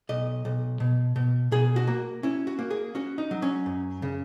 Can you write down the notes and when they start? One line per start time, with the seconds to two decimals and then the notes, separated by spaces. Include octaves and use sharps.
0.09 B1 D#5
0.45 B1
0.80 B2
1.16 B2
1.52 B2 G#4
1.76 F#4
1.87 A#3
2.23 C#4 E4
2.47 F#4
2.59 A#3
2.70 G#4
2.95 C#4 F#4
3.18 D#4
3.31 F#3
3.42 C#4
3.66 F#2
4.02 C#3